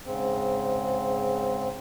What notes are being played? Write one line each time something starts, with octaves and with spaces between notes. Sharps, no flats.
G#2 C#3 C4